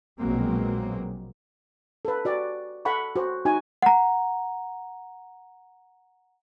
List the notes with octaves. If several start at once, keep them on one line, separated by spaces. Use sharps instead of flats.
A#1 B2 F#3 G#3 A#3 C4
A4 B4
F#4 D5
A4 F#5 B5 C#6
F#4 C5
D#4 F#4 G#5
F#5 A#5